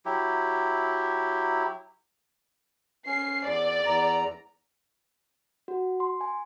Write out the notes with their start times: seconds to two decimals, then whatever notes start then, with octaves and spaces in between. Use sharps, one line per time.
0.06 F#3 E4 G4
3.06 C#4 C7
3.45 E2 D5
3.86 E2 A#5
5.68 F#4
6.00 C6
6.21 G#5